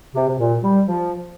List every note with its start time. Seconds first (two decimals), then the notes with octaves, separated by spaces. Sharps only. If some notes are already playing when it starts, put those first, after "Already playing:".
0.15 C3
0.28 C3
0.38 A#2
0.63 G3
0.86 F3